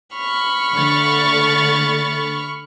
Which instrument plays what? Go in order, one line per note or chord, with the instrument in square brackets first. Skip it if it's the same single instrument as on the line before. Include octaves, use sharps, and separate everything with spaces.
[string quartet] B5 C#6 F6
[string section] D3 A3 A6